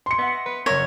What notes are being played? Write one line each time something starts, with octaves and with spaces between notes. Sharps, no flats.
C6 C#7
B3 D#5 E5 F#5
A#6
B3 B4
F#1 A#4 C#5 E5